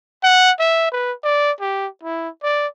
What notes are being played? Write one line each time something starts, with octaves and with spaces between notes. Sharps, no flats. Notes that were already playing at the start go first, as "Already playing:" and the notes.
F#5
E5
B4
D5
G4
E4
D5